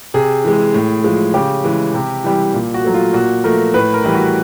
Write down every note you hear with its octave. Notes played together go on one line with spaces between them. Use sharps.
C3 G#4
E3 G#3
A2
F3 G#3
C#3 G4
E3 G#3
C3
E3 G3
A#2
F#4
F#3 A3
F4
A#2 F#4
F3 A3 A#4
A2 B4
A#4
E3 G3
F#4